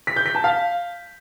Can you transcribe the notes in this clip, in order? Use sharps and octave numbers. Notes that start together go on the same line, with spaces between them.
B6
G6
B6
A5
F5